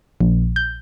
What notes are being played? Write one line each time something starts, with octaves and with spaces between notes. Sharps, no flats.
A#1
G6